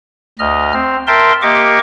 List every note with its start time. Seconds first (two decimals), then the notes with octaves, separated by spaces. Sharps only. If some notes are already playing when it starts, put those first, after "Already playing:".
0.39 D2 D#5 F6
0.73 C4
1.07 A#4 E5 G5 A5 C6
1.42 A#3 G4 D#5 C#6 D6